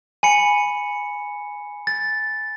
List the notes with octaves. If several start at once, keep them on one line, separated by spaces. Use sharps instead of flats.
G#5 B5 C#7
A6